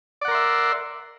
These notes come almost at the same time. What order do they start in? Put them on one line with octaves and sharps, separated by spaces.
D5 F#5 A#4 C6 E5